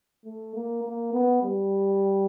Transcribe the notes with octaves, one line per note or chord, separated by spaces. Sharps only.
A3
A#3
A#3
B3
G3